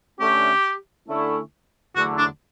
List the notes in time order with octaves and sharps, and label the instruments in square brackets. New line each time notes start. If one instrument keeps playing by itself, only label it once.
[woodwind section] D3 A3 C#4 [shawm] G4
[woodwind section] D3 A3 C#4 E4
[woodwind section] E2 D3 F#3 A3 [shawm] F#4
[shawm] D4